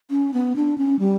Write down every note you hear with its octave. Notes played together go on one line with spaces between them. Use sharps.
C#4
B3
D4
C#4
G3